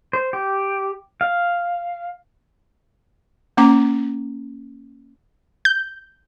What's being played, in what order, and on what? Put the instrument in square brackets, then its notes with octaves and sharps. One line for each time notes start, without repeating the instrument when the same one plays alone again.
[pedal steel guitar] C5
G4
F5
[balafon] A#3 C#4 A#5 D6
[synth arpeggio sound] G6